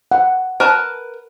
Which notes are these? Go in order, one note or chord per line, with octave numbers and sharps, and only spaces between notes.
F#5
A#4 B4 A5